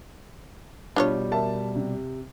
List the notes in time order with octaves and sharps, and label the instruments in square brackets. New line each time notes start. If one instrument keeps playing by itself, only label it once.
[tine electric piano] B2 G3 [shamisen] D4 F4 C#5
[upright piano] A#4 E5 A5
C3